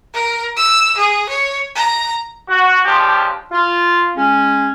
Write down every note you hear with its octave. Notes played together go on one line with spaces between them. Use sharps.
A#4
E6
G#4
C#5
A#5
F#4
C#2 F3 D4 G4
F4
G#3 C#4